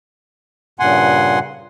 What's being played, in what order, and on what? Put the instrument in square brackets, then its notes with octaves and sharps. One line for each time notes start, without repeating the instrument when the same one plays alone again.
[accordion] G2 A#2 C#3 F#5 G#5 C6